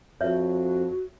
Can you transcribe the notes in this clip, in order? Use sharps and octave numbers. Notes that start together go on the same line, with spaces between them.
F2 F#4 C#5 E5